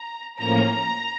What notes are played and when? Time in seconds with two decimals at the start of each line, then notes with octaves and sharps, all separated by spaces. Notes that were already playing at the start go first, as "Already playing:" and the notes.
Already playing: A#5
0.38 A2 F3 A#3 C#4 A#5